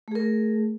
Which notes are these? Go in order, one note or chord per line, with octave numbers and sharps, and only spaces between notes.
A3 G#4 A#4